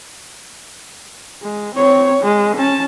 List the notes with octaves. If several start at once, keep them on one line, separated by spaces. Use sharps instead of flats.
G#3
C4 C#5
G#3
C#4 A5